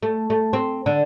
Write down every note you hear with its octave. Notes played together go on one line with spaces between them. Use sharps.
A3
A3
C4
D3